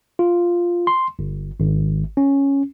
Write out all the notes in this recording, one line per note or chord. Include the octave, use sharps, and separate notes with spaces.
F4
C6
G1
G#1
C#4